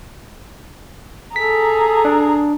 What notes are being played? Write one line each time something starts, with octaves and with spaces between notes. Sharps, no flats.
G#4 A4 A#5 B6
D4